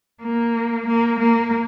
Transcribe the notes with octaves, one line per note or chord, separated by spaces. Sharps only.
A#3
A#3
A#3